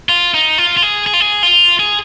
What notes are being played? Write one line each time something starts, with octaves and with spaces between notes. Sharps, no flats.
F4
D#4
F4
F4
G#4
G#4
F4
G#4
F4
G#4